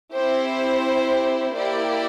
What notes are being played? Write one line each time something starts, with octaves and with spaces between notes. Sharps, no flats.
C4 E4 G4 C5
A#3 E4 G4 D5